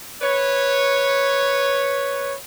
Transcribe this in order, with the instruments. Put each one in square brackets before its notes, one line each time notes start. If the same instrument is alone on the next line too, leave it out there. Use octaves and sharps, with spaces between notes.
[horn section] B4 C#5